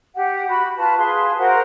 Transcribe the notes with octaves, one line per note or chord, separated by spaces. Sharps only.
G4 F#5
F#4 B5
F4 B4 A5 B5
G#4 B4 F5 C6
F#4 A#4 C5 F#5